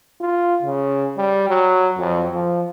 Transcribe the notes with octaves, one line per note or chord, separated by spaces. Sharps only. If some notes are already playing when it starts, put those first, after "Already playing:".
F4
C#3
G3
F#3
F2
F3